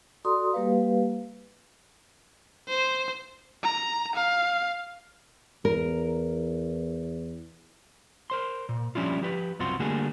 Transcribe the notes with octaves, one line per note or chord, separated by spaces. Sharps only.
F#4 A4 D5 A#5 C6 D#6
G3 A#3 G4 B4 F5
C5
A#5
F5
E2 A#4
A#4 C5 C6
A#2
F3 G3 C#4 D4 E4 F4
F3 G4 B4
C2 F#2 C4 F4 F#4 C6
D3 G3 A3 A#3 F#4 G#4